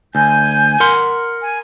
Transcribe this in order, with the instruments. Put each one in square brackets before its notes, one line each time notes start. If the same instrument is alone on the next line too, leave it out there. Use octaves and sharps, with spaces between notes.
[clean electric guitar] D2 [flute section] G#5 G6
[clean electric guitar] A#4 F#5 C6
[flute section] G#5